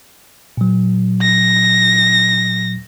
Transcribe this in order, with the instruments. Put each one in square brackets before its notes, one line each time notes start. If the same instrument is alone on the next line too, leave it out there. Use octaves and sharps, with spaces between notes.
[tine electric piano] A#2 F#3
[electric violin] A#6